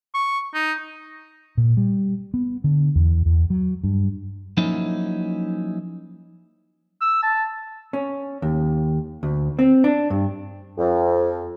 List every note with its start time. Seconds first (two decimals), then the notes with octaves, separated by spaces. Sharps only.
0.15 C#6
0.54 D#4
1.57 A#2
1.77 G3
2.34 B3
2.64 D3
2.96 E2
3.26 E2
3.50 F#3
3.84 G2
4.57 F3 F#3 A#3 C#4 D#4 E4
7.01 E6
7.23 A5
7.93 C#4
8.42 D#2
9.23 D2
9.59 C4
9.84 D4
10.10 G2
10.77 F2